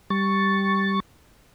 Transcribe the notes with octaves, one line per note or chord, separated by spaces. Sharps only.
G3 C#6 A6